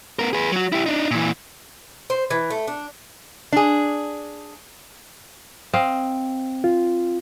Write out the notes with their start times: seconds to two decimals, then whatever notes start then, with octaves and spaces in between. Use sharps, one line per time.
0.19 B3 A#4
0.33 G#4 B4
0.52 F#3 F#4
0.72 E4 G4
0.86 D4 D#4
1.11 A#2 E3
2.10 C5
2.30 E3
2.50 A3
2.68 D4
3.52 D4 G#4
5.74 C4 D#5 F5
6.64 F4